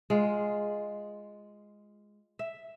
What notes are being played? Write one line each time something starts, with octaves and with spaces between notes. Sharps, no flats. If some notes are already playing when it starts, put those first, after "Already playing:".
G#3 F4
E5